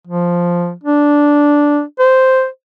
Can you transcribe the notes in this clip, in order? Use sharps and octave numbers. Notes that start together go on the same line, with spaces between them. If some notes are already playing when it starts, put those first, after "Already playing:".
F3
D4
C5